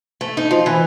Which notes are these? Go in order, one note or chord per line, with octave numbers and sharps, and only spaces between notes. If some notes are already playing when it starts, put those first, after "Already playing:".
A3
D#4
F3
E3